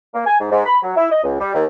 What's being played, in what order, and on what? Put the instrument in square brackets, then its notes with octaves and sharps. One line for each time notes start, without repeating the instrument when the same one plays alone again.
[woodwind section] A#3
G#5
G#2
G#2
B5
F#3
E4
D#5
C#2
G3
D#2